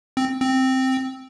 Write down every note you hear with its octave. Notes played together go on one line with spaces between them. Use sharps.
C4
C4